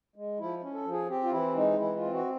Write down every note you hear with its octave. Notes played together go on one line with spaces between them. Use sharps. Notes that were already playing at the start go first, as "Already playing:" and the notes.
G#3
F3 E4
C#4
A4
F3
G#4
C4 G4
F4
E3 E4
G#3 D#4
E3 E4
F4
C4
F#4